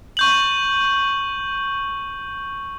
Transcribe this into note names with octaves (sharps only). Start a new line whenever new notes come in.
C#6 G6 F#7